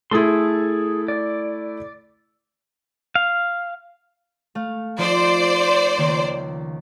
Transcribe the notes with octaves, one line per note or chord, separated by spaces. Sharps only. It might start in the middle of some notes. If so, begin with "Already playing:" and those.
A3 E4 G#4 A4 C6
D5
F5
A3 F5
F3 D#4 C5 D5
C#2 D#3 A#3